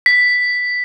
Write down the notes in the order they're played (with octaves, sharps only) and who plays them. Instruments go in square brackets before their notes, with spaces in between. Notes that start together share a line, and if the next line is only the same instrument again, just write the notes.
[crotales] B6